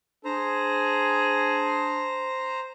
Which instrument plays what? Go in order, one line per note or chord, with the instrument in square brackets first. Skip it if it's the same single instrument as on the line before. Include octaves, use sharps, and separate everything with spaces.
[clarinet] D4 [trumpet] G#4 [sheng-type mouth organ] C5 A#5